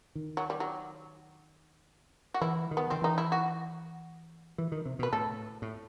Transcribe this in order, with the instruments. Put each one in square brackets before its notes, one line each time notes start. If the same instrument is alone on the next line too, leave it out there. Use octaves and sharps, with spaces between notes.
[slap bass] D#3
[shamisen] F#3
G3
F#3
F#4
[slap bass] E3 [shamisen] E4
[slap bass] D#3
[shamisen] B3
[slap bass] D#3 [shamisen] C4
[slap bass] E3 [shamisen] D#4
[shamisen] E4
F#4
[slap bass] E3
D#3
C3
[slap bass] B2 [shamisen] B4
[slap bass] A2 [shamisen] A4
[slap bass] A2